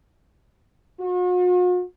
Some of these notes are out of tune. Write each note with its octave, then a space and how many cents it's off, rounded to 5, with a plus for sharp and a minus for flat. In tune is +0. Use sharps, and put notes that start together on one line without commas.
F#4 -45